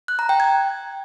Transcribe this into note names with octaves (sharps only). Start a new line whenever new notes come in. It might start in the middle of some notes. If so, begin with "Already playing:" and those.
F#6
A#5
G5
G#6